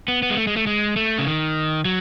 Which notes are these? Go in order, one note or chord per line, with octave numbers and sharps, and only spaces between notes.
B3
B3
G#3
A3
G#3
A3
G#3
A3
C#3
D#3
F#3